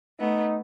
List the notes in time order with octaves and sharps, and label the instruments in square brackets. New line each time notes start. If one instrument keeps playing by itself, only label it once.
[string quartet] A3 B3 [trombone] D#4